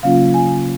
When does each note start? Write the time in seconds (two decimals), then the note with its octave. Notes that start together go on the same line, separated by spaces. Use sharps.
0.03 C#3 F#3 A#3 C#4 F4 F5
0.34 G#5